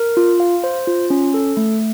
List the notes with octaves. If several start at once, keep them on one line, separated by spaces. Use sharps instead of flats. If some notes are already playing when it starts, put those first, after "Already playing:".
Already playing: A#4
F4
F5
C5
F4
C#4
A4
A3